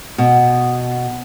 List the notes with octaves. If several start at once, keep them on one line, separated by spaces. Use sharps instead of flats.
B2